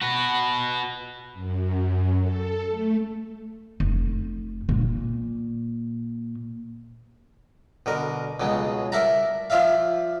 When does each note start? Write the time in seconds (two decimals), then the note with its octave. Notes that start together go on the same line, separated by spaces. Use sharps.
0.01 F#4 B4
1.34 F#2
2.20 A4
2.69 A3
3.80 F1
4.69 A#2
7.86 B2 D3 A#4
8.40 C#2 B2 F#3 G#3
8.92 A#4 D5 E5 F#5 A5 A#5
9.50 F3 F4 D5 E5 F5